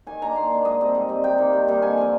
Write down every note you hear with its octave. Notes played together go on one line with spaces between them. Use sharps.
D#3 G#5
A#3 D4 A#5
D#3 C6
A#3 D4
G#2 D#5
G3 C4
G#2
G3 C4
C3 G5
D#3 G3 A#3
C3
D#3 G3 A#3
D3 G#5
F3 C4